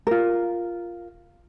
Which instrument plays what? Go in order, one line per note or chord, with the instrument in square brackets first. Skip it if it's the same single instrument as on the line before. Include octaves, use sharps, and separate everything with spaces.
[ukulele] F4 A#4